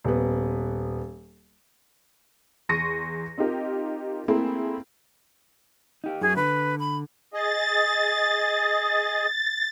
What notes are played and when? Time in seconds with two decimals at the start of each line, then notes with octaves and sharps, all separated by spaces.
0.04 D#1 B3
2.69 E2 C6 C#6 A#6 C#7 D#7
3.38 C4 D#4 F4 G4 A#4
4.28 A3 A#3 C4 E4 G#4
6.04 D#4 G4
6.21 F#2 F#3 G#4
6.36 D3 B4
6.79 B5
7.33 G#4 D#5 A6